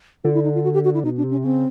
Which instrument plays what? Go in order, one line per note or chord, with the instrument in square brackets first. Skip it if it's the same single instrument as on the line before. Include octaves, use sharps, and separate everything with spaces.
[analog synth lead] D3 [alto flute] F4
[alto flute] E4
D#4
F4
F#4
G4
F#4
E4
[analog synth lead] B2 [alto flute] D#4
[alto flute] D4
[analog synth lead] C3
[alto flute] C#4
[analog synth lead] C#3 [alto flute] C4